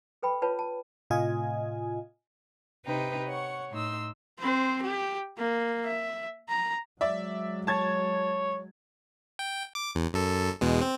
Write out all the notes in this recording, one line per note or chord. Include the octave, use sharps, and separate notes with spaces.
A4 B4 G5 B5
F4 B4 C#5 A5
A5
A2 C3 F4 D#5 G#5
C3 D#4 B4 G5 A#5
C#5 F#5 C#6
A2 D#4 C6 E6
C4 C5
G4
A#3
E5
A#5
F#3 G#3 D5 E5
C#5 A5 G#6 A6
G5
D6
E2
F#2 A4
E2 B2 G#3
C4